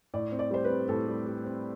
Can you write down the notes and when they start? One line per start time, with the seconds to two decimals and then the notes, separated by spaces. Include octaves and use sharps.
0.14 A2 D5
0.32 C4
0.39 D5
0.51 G3 C5
0.64 B4
0.70 C4
0.88 A2 A4
1.08 G3
1.26 G3
1.45 C4